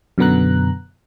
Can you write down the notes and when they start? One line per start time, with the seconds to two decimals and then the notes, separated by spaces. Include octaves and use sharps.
0.18 F#2 B2 D3 B3 A#5 F#6